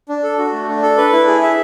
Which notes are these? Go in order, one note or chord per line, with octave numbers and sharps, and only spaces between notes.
D4
A4
F#4
A3
D4
A4
B4
E4
G#4
E5